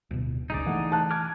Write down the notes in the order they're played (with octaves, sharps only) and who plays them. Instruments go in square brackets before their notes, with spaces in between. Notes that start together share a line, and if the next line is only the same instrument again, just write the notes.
[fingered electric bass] D1 B2
[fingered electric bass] F#1 C#2 [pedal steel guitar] D#4 G#4 D5
[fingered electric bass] E3 A3 [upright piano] F#5
[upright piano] A5 F#6
[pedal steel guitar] G#5 D6 F6